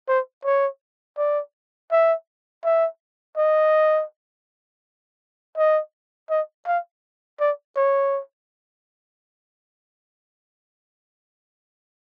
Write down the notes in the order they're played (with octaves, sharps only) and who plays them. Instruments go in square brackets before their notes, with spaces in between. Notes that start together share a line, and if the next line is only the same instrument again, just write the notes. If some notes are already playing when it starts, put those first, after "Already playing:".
[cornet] C5
C#5
D5
E5
E5
D#5
D#5
D#5
F5
D5
C#5